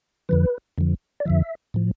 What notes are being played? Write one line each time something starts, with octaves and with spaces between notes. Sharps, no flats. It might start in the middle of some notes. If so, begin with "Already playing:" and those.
F2 D3 F3 B4
F2 D3 F3
D5
F2 D3 F3 E5
A2 F3